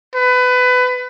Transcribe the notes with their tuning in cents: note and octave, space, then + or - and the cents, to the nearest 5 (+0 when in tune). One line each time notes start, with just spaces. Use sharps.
B4 +25